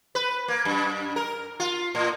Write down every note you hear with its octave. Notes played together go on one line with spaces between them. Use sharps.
B4
A#3
F#2
A#4
F4
A2